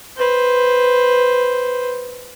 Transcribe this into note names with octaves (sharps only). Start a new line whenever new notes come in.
B4 C5